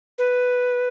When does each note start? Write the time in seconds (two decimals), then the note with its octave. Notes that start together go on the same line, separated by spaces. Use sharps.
0.18 B4